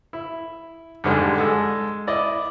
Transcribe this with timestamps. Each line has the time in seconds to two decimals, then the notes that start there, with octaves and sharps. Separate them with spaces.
0.13 E4
1.04 F2 G#2 D3 G3 G#3
1.38 G#3 A4
2.07 E4 D5 D#5